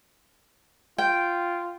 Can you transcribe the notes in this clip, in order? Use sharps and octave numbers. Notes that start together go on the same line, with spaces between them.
F4 G5